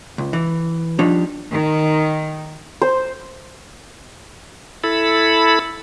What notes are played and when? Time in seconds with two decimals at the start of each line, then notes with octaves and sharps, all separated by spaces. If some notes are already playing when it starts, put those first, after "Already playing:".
0.18 C#2
0.33 E3
0.99 F3 G3 D4 D#4 C#5
1.52 D#3
2.82 C5
4.84 E4 A4 B5